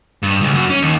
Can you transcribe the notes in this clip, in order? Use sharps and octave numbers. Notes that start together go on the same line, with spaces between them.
G2
C#2
F#2
C#4
D#2